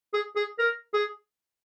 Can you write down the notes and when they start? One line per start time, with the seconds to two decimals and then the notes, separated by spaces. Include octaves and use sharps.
0.14 G#4
0.36 G#4
0.59 A#4
0.94 G#4